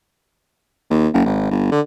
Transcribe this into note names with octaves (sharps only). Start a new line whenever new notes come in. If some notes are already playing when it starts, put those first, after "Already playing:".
D#2
F#1
G#1
G1
D3